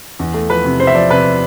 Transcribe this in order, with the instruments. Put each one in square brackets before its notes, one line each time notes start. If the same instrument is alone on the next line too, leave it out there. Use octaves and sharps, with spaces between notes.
[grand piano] E2
A3
F3 B4
C3
C3 C5
E5
F3 D5
C3 B4